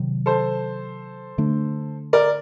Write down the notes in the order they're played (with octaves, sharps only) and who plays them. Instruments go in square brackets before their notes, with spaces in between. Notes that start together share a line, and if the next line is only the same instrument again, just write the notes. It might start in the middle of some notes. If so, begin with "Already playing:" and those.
Already playing: [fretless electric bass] C3 D#3 F#3
[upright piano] A4 C5
[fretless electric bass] D3 A3 D4
[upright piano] A#4 D5